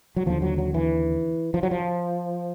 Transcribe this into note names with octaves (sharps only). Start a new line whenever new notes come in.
F#3
D#2 D3 F3
F#3
F#3
E3
F3
F#3
F3